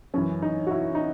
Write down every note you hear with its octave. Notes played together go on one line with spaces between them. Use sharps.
F#2 E3 C#4
D#4
F#4
E4
D#4